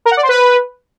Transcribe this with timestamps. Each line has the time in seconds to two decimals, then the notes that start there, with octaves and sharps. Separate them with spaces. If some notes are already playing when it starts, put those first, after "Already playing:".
0.05 A#4
0.11 F#5
0.17 D5
0.23 C5
0.29 B4